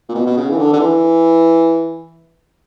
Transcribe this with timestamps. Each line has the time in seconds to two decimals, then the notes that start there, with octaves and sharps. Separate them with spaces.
0.09 A#2
0.15 B2
0.26 B2
0.37 C#3
0.51 E3
0.58 D3
0.73 D3
0.80 E3